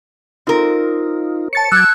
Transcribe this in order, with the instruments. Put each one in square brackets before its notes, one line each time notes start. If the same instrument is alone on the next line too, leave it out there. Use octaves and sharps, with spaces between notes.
[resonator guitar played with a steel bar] C4 A#4 [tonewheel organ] D#4 F4
[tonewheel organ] C#5 [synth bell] A5 A6 C#7
[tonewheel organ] F#3 D6 [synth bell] E6 G#6 [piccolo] F#6